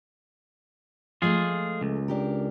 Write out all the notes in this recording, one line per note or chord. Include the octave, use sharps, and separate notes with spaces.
F3 G#3 A3 F4 G#4
C#2
D4 G4 A#4